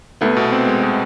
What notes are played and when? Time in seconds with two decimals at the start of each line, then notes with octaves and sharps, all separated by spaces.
0.21 C2 A3 B3
0.37 B2
0.52 C4
0.67 G#3
0.83 B2